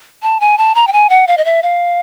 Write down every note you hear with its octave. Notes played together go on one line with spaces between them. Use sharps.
A5
G#5
A5
A#5
G5
G#5
F#5
F5
D#5
E5
F5